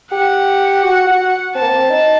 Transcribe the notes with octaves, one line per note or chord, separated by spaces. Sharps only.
G4 F#5
F#4
F#4
C4 A5
A#3
C4
D#4